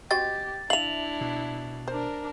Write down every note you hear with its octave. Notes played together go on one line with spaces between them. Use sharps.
C4 F#4 G4 D#5 A6
D4 E4 E5 F5 F7 F#7
B2
D4 A#4 C5